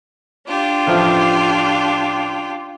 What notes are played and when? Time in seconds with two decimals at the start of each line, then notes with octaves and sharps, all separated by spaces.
0.47 D4 F4 G4
0.87 A1 F3